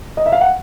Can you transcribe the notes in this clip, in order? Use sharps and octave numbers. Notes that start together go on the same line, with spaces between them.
D#5
E5
F5
F#5